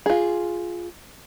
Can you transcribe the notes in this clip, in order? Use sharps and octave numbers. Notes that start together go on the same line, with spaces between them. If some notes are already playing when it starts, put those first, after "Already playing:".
F4 G#4